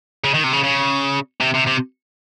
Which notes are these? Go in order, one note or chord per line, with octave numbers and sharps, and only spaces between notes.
C#3
D#3
C3
C#3
C#3
C3
C3
C3